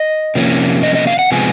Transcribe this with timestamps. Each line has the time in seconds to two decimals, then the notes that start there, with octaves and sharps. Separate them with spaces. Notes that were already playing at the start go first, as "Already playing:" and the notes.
Already playing: D#5
0.35 C3 F3 A#3 C#4
0.83 D#5
0.95 D#5
1.07 F5
1.19 F#5
1.32 C3 F3 G#3 B3 G#5